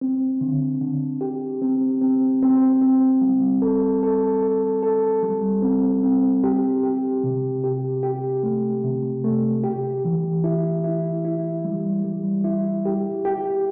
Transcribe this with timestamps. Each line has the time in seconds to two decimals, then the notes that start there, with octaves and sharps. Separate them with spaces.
0.01 C4
0.41 D3
0.81 D3
1.21 G4
1.62 C4
2.01 C4
2.42 C4
2.81 C4
3.21 G3
3.62 A4
4.03 A4
4.42 A4
4.83 A4
5.23 G3
5.62 C4
6.03 C4
6.44 G4
6.83 G4
7.24 C3
7.64 G4
8.03 G4
8.43 A3
8.84 C3
9.24 A3
9.64 G4
10.05 E3
10.44 E4
10.84 E4
11.25 E4
11.65 G3
12.04 G3
12.44 E4
12.86 G4
13.25 G4